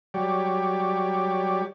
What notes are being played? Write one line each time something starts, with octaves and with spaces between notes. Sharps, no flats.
F#3 G3 G4 C#5 D5